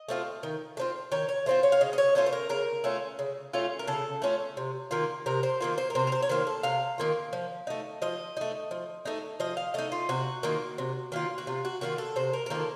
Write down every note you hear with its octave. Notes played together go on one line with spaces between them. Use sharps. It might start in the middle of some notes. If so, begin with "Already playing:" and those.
Already playing: D#5
A3 C4 F4
D#3
A3 C4 F4
D#3 C#5
C#5
A3 C4 F4 C5
C#5
F5
C#3 D#5
D#5
C#5
A3 C#4 F4 C5
C5
A#4
C#3 A#4
A3 C#4 F4
C#3
A3 C#4 F4
A#4
C#3 A4
A3 C#4 F4
C3
D#3 A#3 F4
C3 A#4
C5
D#3 A#3 F4
C5
A#4
C3 C5
A#4
C5
C#5
D#3 A#3 F4 C5
A4
C3 F5
D#3 A#3 F4
F3
A3 D#4
F3 D#5
A3 D#4
F3
A3 D#4
F3 D#5
F5
A3 D#4 D#5
F4
C3 F#4
D#3 A#3 F4
C3
D#3 A#3 F4
F#4
C3 F4
F#4
D#3 A#3 F4 F#4
A4
C3 C5
A#4
A#4
D#3 A#3 F4 A4